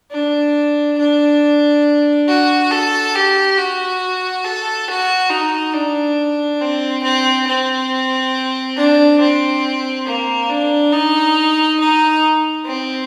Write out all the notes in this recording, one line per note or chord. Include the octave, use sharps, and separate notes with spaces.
D4
D4
F#4
A4
G4
F#4
A4
F#4
D#4
D4
C4
C4
C4
D4
C4
A#3
D4
D#4
D#4
C4